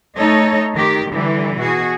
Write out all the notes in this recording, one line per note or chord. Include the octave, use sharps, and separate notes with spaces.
A3 D#4 A4 C#5 D#5
D#3 G4
D3 E3 G3
B2 F#4 G#4